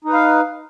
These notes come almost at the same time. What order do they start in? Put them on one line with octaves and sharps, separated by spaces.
D#4 B4 F5